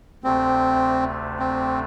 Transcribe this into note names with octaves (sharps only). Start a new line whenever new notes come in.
D2 C3 A3 C4
C4